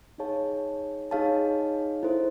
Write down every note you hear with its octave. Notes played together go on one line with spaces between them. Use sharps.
D#4 G#4 C#5 F5 A5
D#4 G#4 C#5 F5 A5
E4 A4 C5